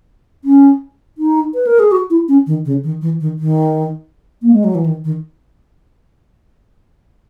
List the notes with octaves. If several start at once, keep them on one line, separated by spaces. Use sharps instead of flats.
C#4
D#4
B4
A#4
G#4
F#4
E4
C#4
D#3
C#3
D#3
E3
D#3
D#3
A#3
G#3
F#3
E3
D#3
D#3